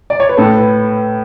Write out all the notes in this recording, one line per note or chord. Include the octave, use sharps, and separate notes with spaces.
D5
C#5
B4
A2 A4
B4